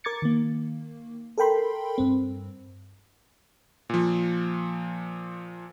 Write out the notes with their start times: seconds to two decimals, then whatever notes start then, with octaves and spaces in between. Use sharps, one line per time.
0.04 A#4 D6 G#6 A6 C#7
0.22 D#3 A#3
1.38 A4 A#4 G5 B5 C6
1.98 G2 C4
3.90 A#2 F3